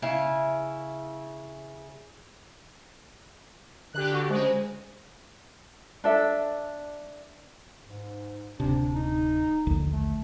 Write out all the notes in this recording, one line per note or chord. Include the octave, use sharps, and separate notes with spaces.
C#3 E4 F5
D3 G4 F#6
F#4
C#3 G#3 C5
D4 A4 E5
G#2
D1 C3 D4
D#4
A#1 D#2 D3
A3